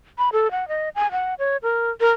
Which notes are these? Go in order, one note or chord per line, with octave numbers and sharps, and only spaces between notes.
B5
A4
F#5
D#5
G#5
F#5
C#5
A#4
A#4